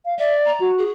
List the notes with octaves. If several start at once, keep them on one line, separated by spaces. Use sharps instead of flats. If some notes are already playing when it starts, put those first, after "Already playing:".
F5
D5 E5
A#5
F#4
G#4